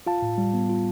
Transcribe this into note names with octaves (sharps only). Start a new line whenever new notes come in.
F4 F5 A5
A2
G3
B3
F4